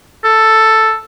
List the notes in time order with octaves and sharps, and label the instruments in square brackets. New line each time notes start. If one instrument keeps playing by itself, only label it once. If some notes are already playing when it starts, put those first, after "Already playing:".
[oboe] A4